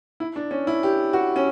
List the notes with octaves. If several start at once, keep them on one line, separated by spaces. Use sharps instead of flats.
E4
D4
C#4
E4
G4
F#4
C#4